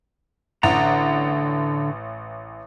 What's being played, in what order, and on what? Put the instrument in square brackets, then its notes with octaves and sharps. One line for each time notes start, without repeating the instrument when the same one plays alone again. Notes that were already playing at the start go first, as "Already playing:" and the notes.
[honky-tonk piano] A1 [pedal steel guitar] D3 F#5 A#5